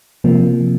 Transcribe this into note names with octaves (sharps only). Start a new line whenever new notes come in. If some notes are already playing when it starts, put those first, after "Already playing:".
C3 F3 A#3